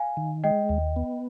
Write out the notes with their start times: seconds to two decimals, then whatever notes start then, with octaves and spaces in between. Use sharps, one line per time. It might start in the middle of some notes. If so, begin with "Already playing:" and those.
Already playing: F5 G#5
0.17 D#3
0.44 G#3 D#5 G5
0.69 D#2
0.96 B3